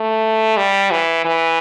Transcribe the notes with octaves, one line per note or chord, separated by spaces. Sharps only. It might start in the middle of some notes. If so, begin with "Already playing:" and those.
Already playing: A3
G3
E3
E3